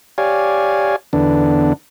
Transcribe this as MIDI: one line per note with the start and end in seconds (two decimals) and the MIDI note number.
0.18 0.96 67
0.18 0.96 73
0.18 0.96 74
0.18 0.96 77
0.18 0.96 80
1.13 1.73 40
1.13 1.73 50
1.13 1.73 59
1.13 1.73 62